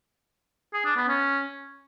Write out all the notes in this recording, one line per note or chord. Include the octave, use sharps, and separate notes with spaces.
G#4
D4
B3
C#4